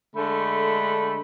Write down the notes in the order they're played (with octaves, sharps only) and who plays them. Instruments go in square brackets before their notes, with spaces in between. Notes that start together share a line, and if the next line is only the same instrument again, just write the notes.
[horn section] D3 G#3 A3 A4 B5